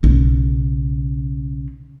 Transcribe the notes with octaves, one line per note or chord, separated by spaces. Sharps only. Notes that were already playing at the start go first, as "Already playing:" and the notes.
B1 C#3